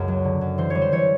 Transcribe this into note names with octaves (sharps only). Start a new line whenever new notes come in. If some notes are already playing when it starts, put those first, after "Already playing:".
Already playing: C#2 F#2 A#4
F#3
D3
F#2
E3 C5
G3 C#5
C5
E3 C#5